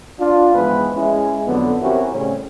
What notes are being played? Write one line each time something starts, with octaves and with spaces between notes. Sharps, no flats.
D4 F4
G#2 E3 F3 G#3 B3 B4
G#3 C#4 E4
F2 D3 F#3 B3
C4 C#4 E4 F#4 G4 A#4
A2 C#3 G3 C4 C#4